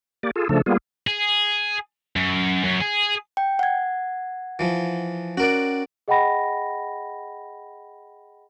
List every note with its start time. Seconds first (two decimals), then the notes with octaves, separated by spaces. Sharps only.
0.23 A#3 G4 D5
0.36 F4 G#4 A4
0.49 C#3 F3 A3 D4 A4
0.66 G3 A#3 B3 F4 G#4
1.07 G#4
2.16 F#2
2.64 F#2
2.81 G#4
3.37 G5
3.59 F#5 G#6
4.59 E3 F3
5.37 C#4 F#4 A#4 D5
6.08 G#4 D#5 F#5 G5 B5 A#6